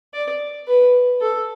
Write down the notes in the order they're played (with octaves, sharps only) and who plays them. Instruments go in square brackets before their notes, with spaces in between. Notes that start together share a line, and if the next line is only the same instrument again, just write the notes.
[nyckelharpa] D5
B4
A4